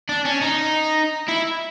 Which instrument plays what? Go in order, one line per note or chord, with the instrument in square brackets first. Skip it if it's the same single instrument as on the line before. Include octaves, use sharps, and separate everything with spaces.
[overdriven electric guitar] D4
C#4
D#4
E4